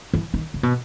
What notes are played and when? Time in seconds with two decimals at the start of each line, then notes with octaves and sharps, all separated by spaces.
0.14 E3
0.34 D#3
0.54 C#3
0.63 B2